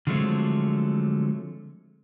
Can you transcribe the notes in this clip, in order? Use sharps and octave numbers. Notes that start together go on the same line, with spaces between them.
D3 F3 F#3 G#3 A3 C4